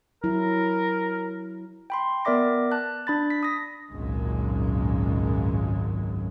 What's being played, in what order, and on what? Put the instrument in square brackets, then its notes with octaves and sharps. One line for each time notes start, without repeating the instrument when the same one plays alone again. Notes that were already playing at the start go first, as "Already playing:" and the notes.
[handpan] F#3 E4 [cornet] A#4
[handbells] G5 B5 C6
B3 A#4 D5 E5 D6 A#6
A5 F#6
D4 B5 A6
B6
D#6 A#6
[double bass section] G#1 C#2 F#2 A#2 G#3